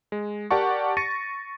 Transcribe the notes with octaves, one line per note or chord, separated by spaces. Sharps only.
G#3
G4 A#4 D5 F#5 A5 C#6
C#6 A6 A#6 C#7 D#7